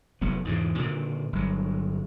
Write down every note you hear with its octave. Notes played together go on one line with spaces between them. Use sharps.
F1 F3 F#3 B3
E2 G#2 C#3
A#2 D3 D#3
G1 F#3